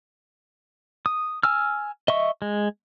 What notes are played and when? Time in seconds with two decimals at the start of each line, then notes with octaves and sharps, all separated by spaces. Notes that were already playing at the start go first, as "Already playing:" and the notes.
1.06 D#6
1.43 G#5 E6 F6
2.08 D#5 E5 C#6
2.42 G#3